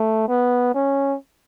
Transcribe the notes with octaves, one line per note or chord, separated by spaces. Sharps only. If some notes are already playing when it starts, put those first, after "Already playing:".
Already playing: A3
B3
C#4